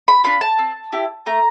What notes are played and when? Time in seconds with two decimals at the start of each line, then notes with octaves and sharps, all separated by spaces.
0.08 B5
0.24 D4 F4 B5
0.41 A5
0.59 C4
0.92 E4 G4
1.26 A3 A#5